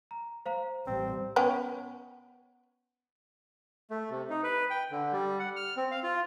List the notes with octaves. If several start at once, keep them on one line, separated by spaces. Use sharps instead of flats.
A#5
C5 F5 A#5
A1 G3 C4
B3 C#4 G5
A3
C3
D#4
B4
G5
D3
G3
F#5
F6
C4
F5
F4